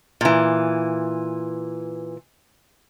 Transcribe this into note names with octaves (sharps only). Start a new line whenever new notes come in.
A#2 E3